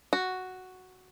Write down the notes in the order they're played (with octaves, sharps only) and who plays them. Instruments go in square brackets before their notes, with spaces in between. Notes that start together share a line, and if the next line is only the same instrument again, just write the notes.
[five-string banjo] F#4